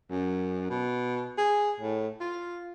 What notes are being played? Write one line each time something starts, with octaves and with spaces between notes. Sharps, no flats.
F#2
B2
G#4
A2
F4